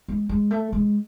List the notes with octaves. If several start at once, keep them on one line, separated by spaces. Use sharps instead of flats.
G#3
G#3
A3
G#3